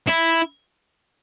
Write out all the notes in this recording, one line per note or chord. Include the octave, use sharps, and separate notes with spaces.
E4